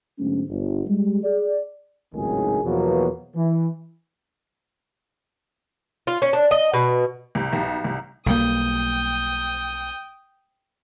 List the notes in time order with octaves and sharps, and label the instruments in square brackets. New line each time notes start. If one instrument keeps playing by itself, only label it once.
[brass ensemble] G#2 D3 F#3 A3 B3 C#4
G1
G3 G#3
G#4 D5
[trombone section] G#1 C#2 A2 D#3 F#3 G#4
E2 B2 F3 F#3 A#3 B3
E3
[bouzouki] F4
C#4
D4
D#5
B2
[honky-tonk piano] C2
B1
C2
[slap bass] B1 G3 A#3 [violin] G5 D#6